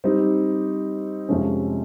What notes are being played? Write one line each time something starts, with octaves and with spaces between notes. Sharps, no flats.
G3 C4 D#4 G4
F2 C3 F3 G#3 C#4